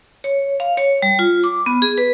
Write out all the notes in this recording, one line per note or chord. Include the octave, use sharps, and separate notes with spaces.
C#5
F5
C#5
G3
F4
D6
B3
G#4
B4